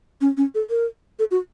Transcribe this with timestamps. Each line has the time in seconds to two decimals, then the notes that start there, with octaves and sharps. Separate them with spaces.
0.21 C#4
0.37 C#4
0.55 A4
0.70 A#4
1.19 A4
1.31 F#4